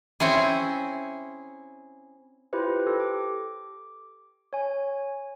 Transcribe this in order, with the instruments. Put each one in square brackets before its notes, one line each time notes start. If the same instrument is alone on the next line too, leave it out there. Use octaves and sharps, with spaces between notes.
[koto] C4 C#4 E4 G#4
[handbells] E4 F4 G4 B4 C5
G4 A4
D6
C#5 G#5